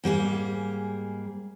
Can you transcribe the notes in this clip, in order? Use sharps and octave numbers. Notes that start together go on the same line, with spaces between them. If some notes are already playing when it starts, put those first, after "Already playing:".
G#2 G3 A#3 G#4